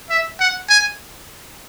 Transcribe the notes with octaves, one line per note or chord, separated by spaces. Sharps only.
E5
F#5
G#5